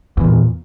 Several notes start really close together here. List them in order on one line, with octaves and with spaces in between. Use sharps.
E2 E3 A#2